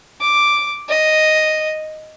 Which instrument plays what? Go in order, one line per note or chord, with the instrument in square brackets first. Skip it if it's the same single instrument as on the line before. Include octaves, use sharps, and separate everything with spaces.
[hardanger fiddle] D6
D#5